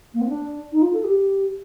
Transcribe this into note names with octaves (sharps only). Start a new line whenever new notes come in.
A#3
C4
D4
D#4
F4
A4
G4